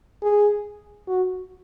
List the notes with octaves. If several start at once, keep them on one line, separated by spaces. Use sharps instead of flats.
G#4
F#4